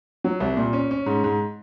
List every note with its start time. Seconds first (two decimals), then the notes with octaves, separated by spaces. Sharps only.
0.24 F#3
0.40 C2
0.57 A#2
0.73 C#4
0.91 C#4
1.06 G#2
1.24 G#2